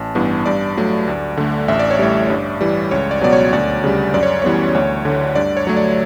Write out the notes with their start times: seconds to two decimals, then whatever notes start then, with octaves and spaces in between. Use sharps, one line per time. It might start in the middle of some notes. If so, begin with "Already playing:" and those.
Already playing: A1 A5
0.15 G2 E3 B3
0.46 G2 D5
0.77 F#3 A3
1.08 D2
1.37 D3 A3
1.68 A1 E5
1.79 D5
1.91 C#5
1.99 A2 G3 D5
2.30 G2
2.61 E3 G3
2.91 C#2 C#5
3.11 D5
3.21 B2 F#3 B3 D5
3.33 C#5
3.52 D2 D5
3.84 C#3 G3
4.14 F#2 D5
4.23 C#5
4.42 E3 G3 B3 C#5
4.75 D2 C#5
5.05 D3 A3
5.35 G2 D5
5.57 C#5
5.67 F#3 A3
5.77 D5